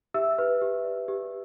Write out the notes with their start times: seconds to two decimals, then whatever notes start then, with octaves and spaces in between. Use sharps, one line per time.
0.14 G4 E5 E6
0.38 B4
0.61 G4
0.84 D5
1.08 G4